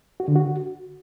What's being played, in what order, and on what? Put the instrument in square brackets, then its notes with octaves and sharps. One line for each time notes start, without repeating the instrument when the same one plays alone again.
[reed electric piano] F#4
D3
F#4